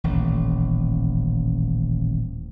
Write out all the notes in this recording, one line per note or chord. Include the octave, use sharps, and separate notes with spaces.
D#1 A1